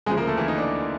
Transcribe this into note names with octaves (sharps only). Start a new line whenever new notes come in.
D2 C#3 F3 G#3 G#4
A#3 A#4
A3 A4
E3 E4
D#4
D4